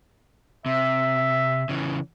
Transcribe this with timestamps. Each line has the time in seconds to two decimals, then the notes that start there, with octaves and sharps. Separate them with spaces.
0.66 C3 E5
1.69 C#3 E3